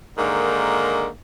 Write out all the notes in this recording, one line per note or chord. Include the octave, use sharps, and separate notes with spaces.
G#2 D3 D#3 A#3